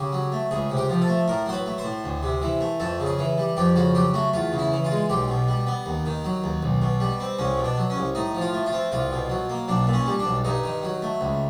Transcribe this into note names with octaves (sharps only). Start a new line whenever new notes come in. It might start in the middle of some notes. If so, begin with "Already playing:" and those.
Already playing: C#3 G4
F#3
A3
C#2 G#4
C3
G4
F3
A4
A3
A2 A#4
F#3 C5
B4
A3
C5
A2
D2
C3
E3
A3
F2 A4
C#3
G#4
E3
G3
F2 G4
C#3 F#4
F#3 G4
A3 F#4
E2 F4
C#3
E4
E3
F4
G#3
B1 G4
B2
G3
B3
D#2
D#3
F#3
D#2
B1
B2
G3
C4
C2 C#4
B2
D4
F#3
C#4
C2
A2 D#4
F3
F4
A3
F4
C4
C2 F4
B2
F#3
A#3
B1 D4
A#2
C#4
G3
D4
B1
G2 D#4
D#3
F#3
A3
C#2